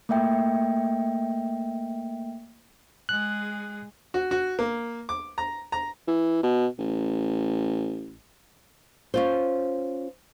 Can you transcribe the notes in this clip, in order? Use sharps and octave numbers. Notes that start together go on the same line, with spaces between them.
A3 A#3 E5 G5
G#3 G#4 F#6
F#4
F#4
A#3
D6
A#5
A#5
E3
B2
A1
C#4 F4 C5